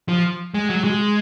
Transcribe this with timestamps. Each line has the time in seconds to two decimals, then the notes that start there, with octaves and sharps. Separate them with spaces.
0.08 F3
0.54 G#3
0.70 F#3
0.84 G#3